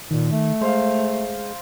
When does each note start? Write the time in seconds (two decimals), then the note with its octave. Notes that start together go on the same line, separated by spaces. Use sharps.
0.11 A#2 D#3
0.32 A3
0.61 G#3 C5 F5